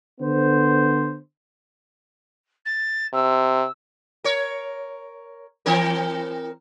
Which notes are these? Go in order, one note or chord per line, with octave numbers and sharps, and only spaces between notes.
D3 B3 C5
A6
C3 E6
A#4 C#5
E3 C4 A#4